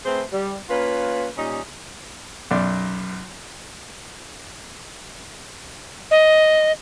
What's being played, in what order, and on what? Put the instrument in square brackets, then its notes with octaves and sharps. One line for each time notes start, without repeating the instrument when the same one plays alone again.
[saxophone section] A3 C4 G#4 B4 C5
G3
A#3 C#4 F4 B4
A#2 G3 C#4 D#4
[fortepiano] B1 F#2 D5
[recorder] D#5